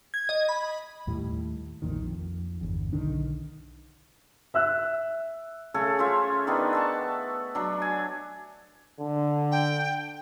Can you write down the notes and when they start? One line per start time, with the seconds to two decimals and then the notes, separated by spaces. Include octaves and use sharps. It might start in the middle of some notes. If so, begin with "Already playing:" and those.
0.14 G#6
0.29 D#5
0.49 B5
1.07 D#2 A2 G3
1.82 A#1 F2 A#2 D#3
2.01 F2
2.61 G1 E2
2.93 B1 D3 D#3 D4
4.54 E5 E6 F#6
5.74 C#3 A3 A4 G#5
5.99 C#4 F4 C5 E5
6.47 D#3 B3 D4 D#4
6.73 E5 A5 C#6
7.55 F#3 D4
7.82 G#5
9.00 D3
9.52 G5